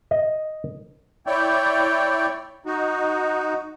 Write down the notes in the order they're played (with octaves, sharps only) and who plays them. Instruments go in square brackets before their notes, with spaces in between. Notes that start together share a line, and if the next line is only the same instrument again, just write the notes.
[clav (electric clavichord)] D#5
[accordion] E4 C#5 D5 G5
D#4 F#4